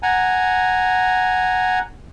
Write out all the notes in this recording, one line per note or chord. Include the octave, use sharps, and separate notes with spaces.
F#5 G#5 A#5